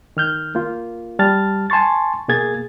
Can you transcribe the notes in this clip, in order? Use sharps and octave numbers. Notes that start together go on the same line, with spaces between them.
D#3 F6 G6
A#3 F4
G3 A5 F6 A6
G#5 A5 C6 C#6 A6
B2 A#3 G#4 G#6 A6